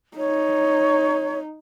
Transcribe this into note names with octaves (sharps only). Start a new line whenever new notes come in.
D#4 C#5